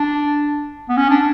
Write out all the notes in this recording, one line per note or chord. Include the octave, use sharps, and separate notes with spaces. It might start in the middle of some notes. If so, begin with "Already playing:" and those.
Already playing: D4
B3
C#4
D4